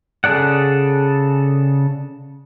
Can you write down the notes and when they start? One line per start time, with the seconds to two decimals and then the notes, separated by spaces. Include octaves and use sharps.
0.24 C#3 G#4 A4 D5 F#5